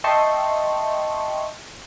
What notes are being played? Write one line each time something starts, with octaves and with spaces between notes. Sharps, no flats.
D#5 E5 G5 A5 C6 C#6